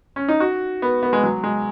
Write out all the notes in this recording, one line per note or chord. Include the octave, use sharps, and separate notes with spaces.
C#4
D#4
F#4
B3
B3
G#3
F#3
G#3